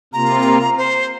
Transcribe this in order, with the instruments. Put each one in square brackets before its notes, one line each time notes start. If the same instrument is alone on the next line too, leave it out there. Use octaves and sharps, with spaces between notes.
[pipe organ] C3 A#3 F4 [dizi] A#5
[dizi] C5